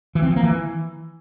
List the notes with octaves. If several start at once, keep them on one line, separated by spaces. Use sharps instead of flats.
E3
C4
F3
A#3
E3